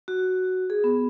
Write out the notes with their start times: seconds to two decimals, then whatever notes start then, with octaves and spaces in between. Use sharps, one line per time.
0.08 F#4
0.70 G#4
0.84 B3